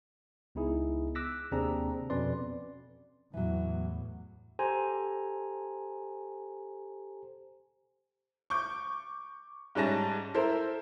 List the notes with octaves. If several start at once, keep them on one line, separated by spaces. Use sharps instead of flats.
C#2 B3 D#4 E4 G#4
D6 E6 F#6 A#6 B6
D#2 C3 C4 D4 G#4 A#5
F2 B2 C#4 B4 D5 C6
E2 A2 E3 F#3
G4 A4 C5 G#5 A#5
C#6 D6 G6
G#2 G3 C#4 A5 A#6
E4 A4 A#4 C5